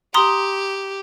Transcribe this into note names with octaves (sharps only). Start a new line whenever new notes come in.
G4 A#5 C6 D#6